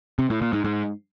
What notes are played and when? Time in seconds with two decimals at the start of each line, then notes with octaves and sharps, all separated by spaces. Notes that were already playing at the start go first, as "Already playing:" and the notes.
0.19 C3
0.30 A2
0.41 A#2
0.53 G#2
0.64 G#2